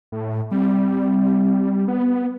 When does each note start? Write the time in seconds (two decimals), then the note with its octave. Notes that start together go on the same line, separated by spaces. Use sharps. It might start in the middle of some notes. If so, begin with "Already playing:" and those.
0.12 A2
0.51 G3 C4
1.88 B3